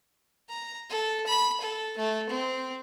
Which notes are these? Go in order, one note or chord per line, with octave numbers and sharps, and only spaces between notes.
A#5
A4
B5
A4
A3
C4